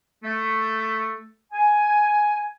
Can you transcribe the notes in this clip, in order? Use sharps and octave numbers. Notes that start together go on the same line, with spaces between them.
A3
G#5